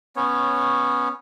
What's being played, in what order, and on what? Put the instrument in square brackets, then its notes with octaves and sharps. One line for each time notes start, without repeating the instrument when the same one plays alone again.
[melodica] B3 C#4 C#5